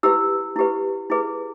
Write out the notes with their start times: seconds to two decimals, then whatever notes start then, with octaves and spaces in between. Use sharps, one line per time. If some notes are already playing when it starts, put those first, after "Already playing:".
0.03 E4 G4 B4 E6
0.56 E4 G4 B4
1.10 E4 G#4 B4